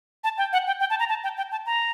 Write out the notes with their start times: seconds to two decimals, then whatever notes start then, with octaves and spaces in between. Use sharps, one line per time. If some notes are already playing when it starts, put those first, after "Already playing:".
0.24 A5
0.38 G5
0.53 F#5
0.67 G5
0.80 G5
0.90 A5
0.99 A#5
1.09 A5
1.24 G5
1.37 G5
1.51 A5
1.66 A#5